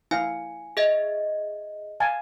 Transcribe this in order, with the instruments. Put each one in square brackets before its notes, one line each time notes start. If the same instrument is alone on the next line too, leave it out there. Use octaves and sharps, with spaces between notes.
[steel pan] E4 F5 [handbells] G#5
[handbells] G#4 D#5 E5
[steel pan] F5 G#5 A5